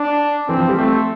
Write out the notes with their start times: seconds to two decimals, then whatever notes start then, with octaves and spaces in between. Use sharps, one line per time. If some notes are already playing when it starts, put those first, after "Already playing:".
Already playing: D4
0.48 E3 C4
0.58 F3
0.69 G3
0.78 A3 C4